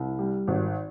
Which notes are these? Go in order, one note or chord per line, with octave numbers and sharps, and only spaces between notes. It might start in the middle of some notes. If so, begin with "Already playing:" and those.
Already playing: C2
G3
G#1